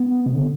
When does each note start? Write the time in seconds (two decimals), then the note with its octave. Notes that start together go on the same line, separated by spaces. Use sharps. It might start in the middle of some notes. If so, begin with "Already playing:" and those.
Already playing: B3
0.26 C3
0.35 D3